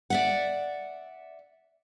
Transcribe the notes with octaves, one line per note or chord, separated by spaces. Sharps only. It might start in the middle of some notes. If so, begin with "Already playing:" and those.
D5 E5 F#5